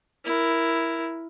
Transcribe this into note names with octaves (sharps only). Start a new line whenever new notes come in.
E4 A#4